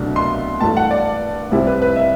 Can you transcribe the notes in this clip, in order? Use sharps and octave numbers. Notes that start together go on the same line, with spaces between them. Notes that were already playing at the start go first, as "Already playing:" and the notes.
Already playing: C2 B2 F#3 A3 D4
C6
G2 E3 A3 A5
F#5
D5
C2 C3 G3 C4 E4
B4
B4
E5